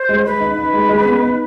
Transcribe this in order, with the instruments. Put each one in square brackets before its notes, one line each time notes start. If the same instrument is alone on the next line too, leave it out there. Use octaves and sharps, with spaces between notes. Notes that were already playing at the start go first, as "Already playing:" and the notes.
Already playing: [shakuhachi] C5
[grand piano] G#3
[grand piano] G#3 [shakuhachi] B4
[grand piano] D#4
D#4
G#3
G#3
B3
D#4